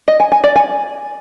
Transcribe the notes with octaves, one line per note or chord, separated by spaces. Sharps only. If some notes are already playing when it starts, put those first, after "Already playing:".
D#5
G#5
G#5
D5
G#5